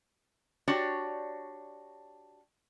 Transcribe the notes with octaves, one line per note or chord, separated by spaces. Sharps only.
D4 F#4 G4 C#5 D5 A5